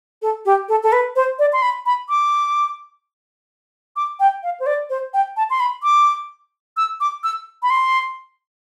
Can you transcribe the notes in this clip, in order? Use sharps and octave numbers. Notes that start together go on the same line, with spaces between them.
A4
G4
A4
A4
B4
C5
D5
C6
B5
B5
D6
D6
G5
F5
C5
D5
C5
G5
A5
C6
B5
D6
E6
D6
E6
B5
C6